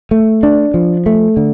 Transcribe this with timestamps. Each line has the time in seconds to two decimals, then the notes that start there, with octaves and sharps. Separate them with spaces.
0.11 A3
0.43 D4
0.74 F3
1.06 A3
1.37 D3